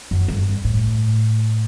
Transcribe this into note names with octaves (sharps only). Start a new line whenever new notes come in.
F#2
G2
A2